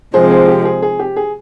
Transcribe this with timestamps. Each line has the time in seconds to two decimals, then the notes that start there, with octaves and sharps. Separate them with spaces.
0.14 C3 F3 G#3 C4 G#4 C5
0.31 G#4
0.48 G4
0.65 G#4
0.82 G#4
0.99 G4
1.16 G#4